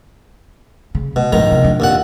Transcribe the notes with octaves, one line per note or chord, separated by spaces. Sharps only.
C#3
B2 G#3
A#1 D#2 G#2 D#3 A#5
C3
F2 D4
D#2 A#2 F#5